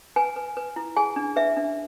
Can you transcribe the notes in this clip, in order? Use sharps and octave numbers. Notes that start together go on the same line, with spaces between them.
B4 G#5
B4
B4
E4
G#4 G#5
D4
B4 E5
D4